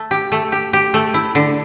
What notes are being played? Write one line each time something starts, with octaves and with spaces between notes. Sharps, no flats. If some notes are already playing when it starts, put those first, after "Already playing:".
Already playing: A3
G4
A3
G4
G4
A3
E4
D3